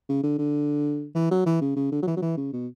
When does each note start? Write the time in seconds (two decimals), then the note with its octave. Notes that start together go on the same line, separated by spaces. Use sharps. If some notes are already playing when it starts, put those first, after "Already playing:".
0.09 C#3
0.23 D3
0.38 D3
1.15 E3
1.31 F#3
1.46 E3
1.61 C#3
1.76 C#3
1.92 D3
2.02 F#3
2.07 E3
2.17 F#3
2.22 E3
2.37 C#3
2.53 B2